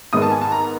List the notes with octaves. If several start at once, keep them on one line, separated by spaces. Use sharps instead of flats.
G#2 D#3 G#3 B3 D#6
A5
G#5
A5
A#5